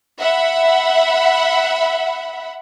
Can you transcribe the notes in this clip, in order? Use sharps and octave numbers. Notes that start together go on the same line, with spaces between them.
E5 F#5 B5